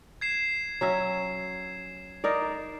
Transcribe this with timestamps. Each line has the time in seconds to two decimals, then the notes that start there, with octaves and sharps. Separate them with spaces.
0.21 G#6 C7 E7
0.81 F#3 C#4 E5
2.24 D#4 A#4 D5